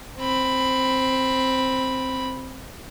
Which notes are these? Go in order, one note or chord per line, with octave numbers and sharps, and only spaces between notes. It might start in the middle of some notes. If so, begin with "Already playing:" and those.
C4 B5